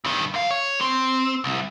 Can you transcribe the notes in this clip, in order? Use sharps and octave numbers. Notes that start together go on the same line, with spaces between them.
G2 D#3
F#2 F5
C#5
C4
C2